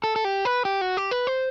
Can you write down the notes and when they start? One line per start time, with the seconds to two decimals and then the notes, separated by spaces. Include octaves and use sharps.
0.04 A4
0.16 A4
0.25 G4
0.45 B4
0.65 G4
0.81 F#4
0.97 G4
1.11 B4
1.27 C5